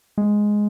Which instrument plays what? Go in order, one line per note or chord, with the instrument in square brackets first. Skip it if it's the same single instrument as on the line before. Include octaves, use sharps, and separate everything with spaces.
[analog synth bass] G#3